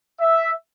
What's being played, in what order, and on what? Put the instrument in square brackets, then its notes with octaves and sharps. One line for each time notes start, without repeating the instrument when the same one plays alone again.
[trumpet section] E5